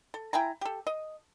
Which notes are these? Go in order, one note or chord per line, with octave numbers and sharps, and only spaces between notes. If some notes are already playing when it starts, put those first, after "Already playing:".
A4
E4 G5 G#5 A#5
G4 A4
D#5